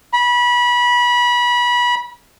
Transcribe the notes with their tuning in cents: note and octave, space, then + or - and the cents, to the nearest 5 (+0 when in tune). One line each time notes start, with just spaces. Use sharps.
B5 -25